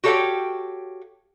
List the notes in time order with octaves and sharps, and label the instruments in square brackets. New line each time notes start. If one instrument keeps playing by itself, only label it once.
[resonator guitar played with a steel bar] F#4 G4 A4 C#5 F5 G5